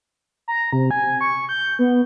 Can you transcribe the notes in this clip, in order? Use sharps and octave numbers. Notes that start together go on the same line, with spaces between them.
A#5
C3
G#5
C#6
G6
B3